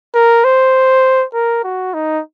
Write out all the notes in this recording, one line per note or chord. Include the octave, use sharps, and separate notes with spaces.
A#4
C5
A#4
F#4
D#4